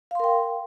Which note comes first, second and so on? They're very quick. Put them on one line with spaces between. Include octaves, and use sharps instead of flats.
F5 C6 A#4 G5